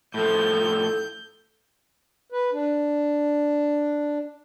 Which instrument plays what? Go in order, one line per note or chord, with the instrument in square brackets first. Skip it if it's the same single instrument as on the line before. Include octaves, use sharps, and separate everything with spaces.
[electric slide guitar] A2 F3 [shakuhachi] A4 [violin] G6
[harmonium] B4
D4